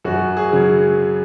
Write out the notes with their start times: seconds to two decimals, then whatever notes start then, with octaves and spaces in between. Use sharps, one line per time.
0.05 F#2 F#4
0.37 G#4
0.52 C#3 F#3